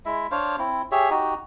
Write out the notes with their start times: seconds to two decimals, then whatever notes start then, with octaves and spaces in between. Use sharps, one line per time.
0.06 G#3 E4 E5
0.31 D4 C5 C#5 F5
0.59 C4 E4
0.92 G4 G#4 C#5 E5
1.11 D#4 F#4 G4